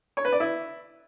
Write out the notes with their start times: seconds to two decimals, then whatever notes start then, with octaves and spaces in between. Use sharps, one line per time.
0.17 C#5
0.25 B4
0.32 D5
0.40 E4